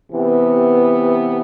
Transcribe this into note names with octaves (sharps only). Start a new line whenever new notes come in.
C3 E3 B3